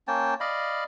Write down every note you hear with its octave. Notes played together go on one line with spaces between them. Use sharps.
A#3 C#4 G5 A5
D5 D#5 F5 B5